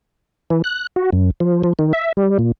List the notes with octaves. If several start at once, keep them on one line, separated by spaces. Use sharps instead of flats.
E3
F#6
F#4
F#2
F3
F3
D#3
E5
G3
A#2